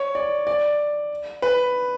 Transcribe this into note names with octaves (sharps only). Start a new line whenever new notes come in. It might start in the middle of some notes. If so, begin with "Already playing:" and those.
Already playing: C#5
D5
D5
B4